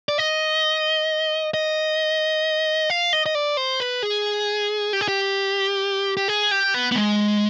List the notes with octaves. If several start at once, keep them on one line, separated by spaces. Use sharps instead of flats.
D5
D#5
D#5
F5
D#5
D#5
D5
C5
B4
G#4
G4
G#4
G4
G4
G#4
G4
B3
B3
G#3